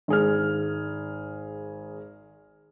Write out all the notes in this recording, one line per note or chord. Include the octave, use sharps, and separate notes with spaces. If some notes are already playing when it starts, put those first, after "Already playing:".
G#1 G#4 F6